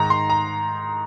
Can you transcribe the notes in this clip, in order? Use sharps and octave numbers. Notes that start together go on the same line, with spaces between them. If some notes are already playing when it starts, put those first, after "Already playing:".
Already playing: G#2 D#3 A#5
C6
A#5